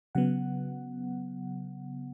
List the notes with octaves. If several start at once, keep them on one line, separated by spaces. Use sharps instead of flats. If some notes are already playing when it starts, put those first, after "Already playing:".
C#3 F#3 B3 F#5